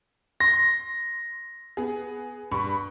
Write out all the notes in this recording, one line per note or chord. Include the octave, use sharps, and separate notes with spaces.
C6 A#6
B3 G#4
G2 B5 C#6